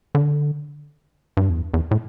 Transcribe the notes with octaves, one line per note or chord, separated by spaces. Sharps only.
D3
G2
E2
E2
A2